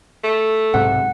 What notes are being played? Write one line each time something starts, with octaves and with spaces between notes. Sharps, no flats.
A3
B1 G#2 C3 F#5